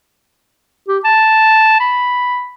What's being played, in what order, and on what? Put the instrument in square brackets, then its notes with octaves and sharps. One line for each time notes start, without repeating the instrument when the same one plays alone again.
[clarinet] G4
A5
B5